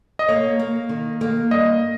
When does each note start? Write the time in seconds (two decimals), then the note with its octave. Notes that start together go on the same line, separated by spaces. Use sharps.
0.19 D#5
0.28 A#3 C#5
0.59 A#3
0.89 D#3
1.21 A#3
1.51 G2 D#5